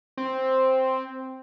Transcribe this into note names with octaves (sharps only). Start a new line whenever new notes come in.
C4